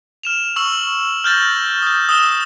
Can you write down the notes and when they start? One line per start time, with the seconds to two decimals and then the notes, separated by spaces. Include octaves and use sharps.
0.23 F6 E7 F7
0.56 C#6 E6 F#7
1.24 F6 G6 A6 A#6
1.82 D#6 G6
2.09 D#6 E6 E7 G7